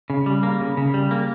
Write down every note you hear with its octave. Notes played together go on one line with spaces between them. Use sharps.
C#3
G3
A#3
C#3
C#3
G3
A#3